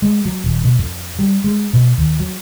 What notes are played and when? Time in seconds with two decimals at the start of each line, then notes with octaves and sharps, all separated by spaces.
0.02 G#3
0.25 F#3
0.44 D#1
0.64 B2
0.79 F2
1.19 G3
1.44 G#3
1.73 B2
1.98 D#2
2.20 F#3